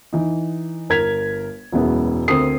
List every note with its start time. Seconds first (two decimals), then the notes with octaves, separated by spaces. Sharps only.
0.13 E3 D#4
0.89 G1 A#4 G#6 B6 F7
1.72 E1 F#2 G#3 B3 E4
2.28 D2 C4 A4 A#4 D#6 C7